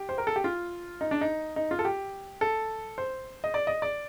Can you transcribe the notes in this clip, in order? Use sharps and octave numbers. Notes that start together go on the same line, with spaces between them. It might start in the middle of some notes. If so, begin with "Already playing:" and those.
Already playing: G4
C5
A#4
A4
G4
F4
D#4
D4
D#4
D#4
F4
A4
G4
A4
C5
D#5
D5
D#5
D5